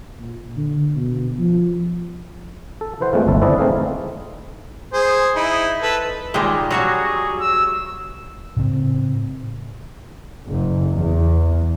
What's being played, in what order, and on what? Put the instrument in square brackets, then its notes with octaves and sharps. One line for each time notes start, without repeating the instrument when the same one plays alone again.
[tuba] A#2
D3
B2
F3
[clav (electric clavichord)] A4
E3 B4 C5 F#5
G#3 A3 C4 F4
G1 C#2 A4 B4 E5
C4 E4 A4 B4 D5 D#5
A3 C4 D#4 G#4 E5 F5
[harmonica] G#4 C5
D#4 E4
A4 B4
[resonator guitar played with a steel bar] A#2 D#3 G4 [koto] G3 G#3
[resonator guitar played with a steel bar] F#3 [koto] G3 F#4 C#5 [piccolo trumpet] G#4
[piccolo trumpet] E6
[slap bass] A2 C#3 C4
[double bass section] F#1
E2